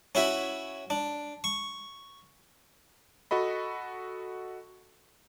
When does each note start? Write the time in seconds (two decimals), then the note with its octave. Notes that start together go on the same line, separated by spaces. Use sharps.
0.15 C#4 E4 F#4 E5
0.90 D4
1.44 C#6
3.31 F#4 A4 D#5 B5